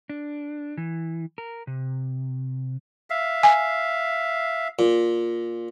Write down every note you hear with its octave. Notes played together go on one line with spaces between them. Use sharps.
D4
E3
A#4
C3
E5 F5
G#5
A#2